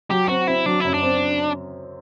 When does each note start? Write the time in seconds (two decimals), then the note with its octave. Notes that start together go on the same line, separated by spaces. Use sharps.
0.10 F#3 G4
0.29 C4 F#4
0.47 C4 E4
0.66 F#3 D4
0.80 F#2 E4
0.94 D4
1.03 C4